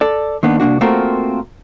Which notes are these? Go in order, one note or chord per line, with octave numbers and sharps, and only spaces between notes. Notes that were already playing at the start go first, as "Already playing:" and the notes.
A4 D5
D#3 A#3 B3 D4
C2 A#3 D4 F#4
A3 A#3 C4 F4 F#4 A#4